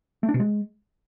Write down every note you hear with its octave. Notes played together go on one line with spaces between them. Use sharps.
A3
D4
B2
G#3